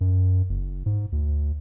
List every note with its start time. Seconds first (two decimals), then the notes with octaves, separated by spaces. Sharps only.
0.01 F#2
0.49 F#1
0.86 G#2
1.12 D2